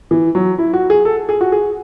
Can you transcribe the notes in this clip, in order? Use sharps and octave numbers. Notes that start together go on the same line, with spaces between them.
E3
F#3
E4
F#4
G#4
A4
G#4
F#4
G#4